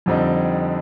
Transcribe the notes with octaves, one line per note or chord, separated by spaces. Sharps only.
F2 D3 G3 C4 D#4